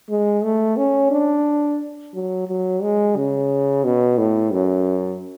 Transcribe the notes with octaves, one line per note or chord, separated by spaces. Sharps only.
G#3
A3
C#4
D4
F#3
F#3
G#3
C#3
B2
A2
F#2